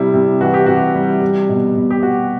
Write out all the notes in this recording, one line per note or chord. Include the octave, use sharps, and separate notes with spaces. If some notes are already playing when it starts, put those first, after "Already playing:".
Already playing: C3 G3 E4
C3
E3 F#4
G4
C3 F#4
G3
G3
B2
B2
G4
G3 F#4